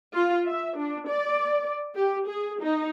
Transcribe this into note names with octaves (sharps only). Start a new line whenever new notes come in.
F4
E5
D4
D5
G4
G#4
D#4